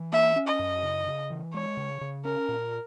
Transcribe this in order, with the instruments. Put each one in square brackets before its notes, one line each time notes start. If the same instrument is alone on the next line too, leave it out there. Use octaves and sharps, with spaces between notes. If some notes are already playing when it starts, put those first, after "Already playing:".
Already playing: [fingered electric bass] E3
[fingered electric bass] A#3 [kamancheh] E5
[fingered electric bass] C#4
[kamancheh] D#5
[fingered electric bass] F#2
C#3
C#3
E3
[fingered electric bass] G#3 [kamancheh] C#5
[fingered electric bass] C#3
C#3
[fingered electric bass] C#4 [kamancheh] A#4
[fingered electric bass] A#2